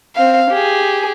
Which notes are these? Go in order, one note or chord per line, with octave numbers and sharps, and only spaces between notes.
C4 F5
G4 G#4